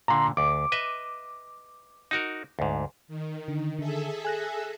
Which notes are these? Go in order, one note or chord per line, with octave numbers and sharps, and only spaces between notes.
A#2 D3 A#5 C6
D2 D6
B4 D#5 E5
D#4 F#4 A#4
D2 G#2
D#3
D3
D3 G#4 A4 E5
G#5 F#6 A#6